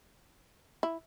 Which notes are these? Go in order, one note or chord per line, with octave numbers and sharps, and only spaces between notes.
E4